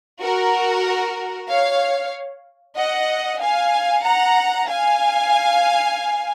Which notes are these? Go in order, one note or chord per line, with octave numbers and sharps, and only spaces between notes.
F#4 A#4
C#5 F5
D#5 F#5
F5 G#5
F#5 A#5
F5 G#5